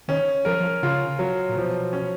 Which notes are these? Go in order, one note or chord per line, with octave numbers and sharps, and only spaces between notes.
D#3 C#4
F3 A#4
F3
C#3 F4
F#3
A#2
B2 F3
C#4